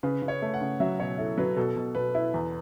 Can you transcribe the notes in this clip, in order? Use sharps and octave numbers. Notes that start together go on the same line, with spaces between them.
C#3 B4
C#3
C#5
A3
F#5
C#3
F#3 E5
B2 C#5
E4 A4
F#3 B4
B2 A4
B2
B2 B4
E4
E2